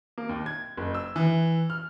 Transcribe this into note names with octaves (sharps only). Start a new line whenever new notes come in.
A#3
D#2
G#6
F#1
E6
E3
F6